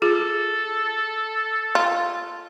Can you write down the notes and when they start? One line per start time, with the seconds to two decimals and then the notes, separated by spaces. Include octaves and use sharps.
0.02 F4 G#4 A4
1.75 F4